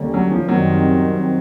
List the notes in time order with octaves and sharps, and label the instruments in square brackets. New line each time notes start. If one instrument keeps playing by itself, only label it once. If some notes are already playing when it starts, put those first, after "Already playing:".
Already playing: [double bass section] D#2 D3 G3 A#3 C#4
[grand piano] F#3
F3
[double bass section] F#2 D#3 G3 C4 [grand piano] F#3